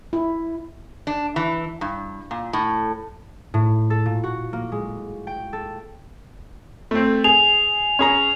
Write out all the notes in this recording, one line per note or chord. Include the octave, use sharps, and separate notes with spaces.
E4
D4
E3
G2
A#2
A2
A2
A4
A#2
F#4
A#3
G#3
G5
A4
A3 C4
G#4 F7
C#4 G#4 A#5